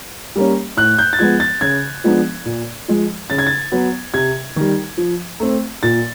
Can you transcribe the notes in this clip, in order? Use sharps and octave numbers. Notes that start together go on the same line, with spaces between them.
G3 A#3 C#4
A2 F#6
G6
A6
F3 G#3 B3 G#6
A6
C#3 G#6
F3 G#3 B3 D4
A#2
F3 G#3
C#3 A6
G#6
A6
F#3 B3
C3 G#6
D#3 G3
F3
A3 C4
A#2 A6